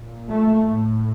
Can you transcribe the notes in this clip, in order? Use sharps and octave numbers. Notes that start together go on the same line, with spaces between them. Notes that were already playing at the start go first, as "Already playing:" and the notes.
Already playing: A#2
A3
A2